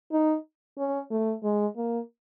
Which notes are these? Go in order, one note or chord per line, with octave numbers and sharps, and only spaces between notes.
D#4
C#4
A3
G#3
A#3